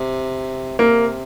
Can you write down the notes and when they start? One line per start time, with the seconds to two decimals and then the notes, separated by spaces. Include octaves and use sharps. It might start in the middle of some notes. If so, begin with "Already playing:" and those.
Already playing: C3
0.79 C3 A#3